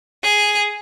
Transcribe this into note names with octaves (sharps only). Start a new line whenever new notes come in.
G#4